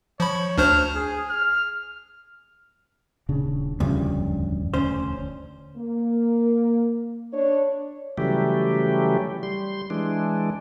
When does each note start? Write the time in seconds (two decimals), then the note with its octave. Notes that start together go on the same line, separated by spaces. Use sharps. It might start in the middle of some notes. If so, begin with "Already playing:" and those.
0.20 F3 C#5 B5
0.58 D2 D4 C5 F6
0.96 G#4
1.30 F6
3.29 D#1 C#3 D4
3.80 E1 D2 G2 C#3 F3
4.74 D2 C#4 C5
5.77 A#3
7.33 D4 C#5
8.18 C#3 E3 F#3 G3 A3 G4
9.43 G3 C6
9.90 E3 G#3 D4